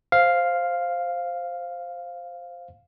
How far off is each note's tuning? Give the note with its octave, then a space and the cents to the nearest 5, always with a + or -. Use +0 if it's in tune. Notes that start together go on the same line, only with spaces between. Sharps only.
C5 +0 F5 +0